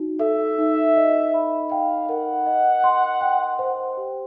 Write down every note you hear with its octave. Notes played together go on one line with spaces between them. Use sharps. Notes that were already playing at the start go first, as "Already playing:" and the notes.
Already playing: D#4 F#4
A4 E5
D#4
D#5
B5
F5 G5
A#4 F#5
D#5
C6
G5
C5
G4